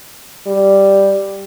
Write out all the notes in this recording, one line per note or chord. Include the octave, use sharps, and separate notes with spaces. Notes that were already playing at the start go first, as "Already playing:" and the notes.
G3